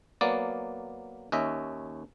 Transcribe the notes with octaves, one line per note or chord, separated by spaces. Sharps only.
F#3 A#3 B3 D5
D#2 C#4 D#5 E5